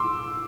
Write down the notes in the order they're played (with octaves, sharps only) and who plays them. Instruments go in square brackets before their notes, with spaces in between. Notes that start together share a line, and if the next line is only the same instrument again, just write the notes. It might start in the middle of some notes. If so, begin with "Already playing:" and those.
Already playing: [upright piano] C6 D6 E6